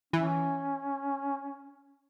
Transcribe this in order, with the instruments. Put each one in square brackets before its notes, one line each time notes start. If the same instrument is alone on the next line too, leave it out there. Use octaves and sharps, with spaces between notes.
[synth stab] E3 [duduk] C#4